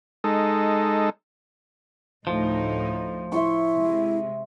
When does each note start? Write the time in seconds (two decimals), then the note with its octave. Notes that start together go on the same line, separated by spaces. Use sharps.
0.24 G#3 D#4 A4
2.27 D2 A2 F3 D#4
3.32 E4 E5 C6 C#6
3.73 C3 G#3